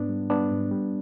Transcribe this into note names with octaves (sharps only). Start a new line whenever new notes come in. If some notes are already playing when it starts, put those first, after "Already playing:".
Already playing: G#2 B3 D4
G3
G3 B3 D4
G#2
G3